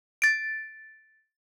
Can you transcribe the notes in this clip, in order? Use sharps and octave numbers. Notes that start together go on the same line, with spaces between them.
A6 D7